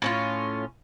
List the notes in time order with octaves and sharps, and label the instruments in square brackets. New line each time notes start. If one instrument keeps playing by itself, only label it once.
[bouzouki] A2 C#4 F4